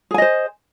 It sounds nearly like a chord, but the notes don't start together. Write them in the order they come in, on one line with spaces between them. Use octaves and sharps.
G#4 G#5 D#5 C5